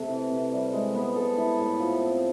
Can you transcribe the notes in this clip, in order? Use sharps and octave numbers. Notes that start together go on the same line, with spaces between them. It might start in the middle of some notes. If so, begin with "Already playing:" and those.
Already playing: C3 A3
E3
C3
G3
G#3
B3
A4
E4
A2
F3
C4